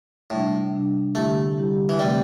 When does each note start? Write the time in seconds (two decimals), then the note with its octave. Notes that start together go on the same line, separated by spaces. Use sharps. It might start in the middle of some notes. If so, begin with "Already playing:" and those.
0.30 A2 C3 G3 D4
0.73 C3 G3 D4
1.15 D3 G3 A3 E4 G4
1.57 D3 G3 E4 G4
1.89 E3
1.99 C3 G3 A3 C4